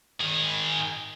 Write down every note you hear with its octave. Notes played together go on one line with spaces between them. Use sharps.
D#3 G#4